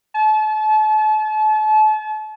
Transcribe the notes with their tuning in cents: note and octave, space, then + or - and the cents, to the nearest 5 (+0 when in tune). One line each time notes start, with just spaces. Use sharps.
A5 -35